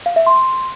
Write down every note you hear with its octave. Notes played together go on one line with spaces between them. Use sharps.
F5
E5
C6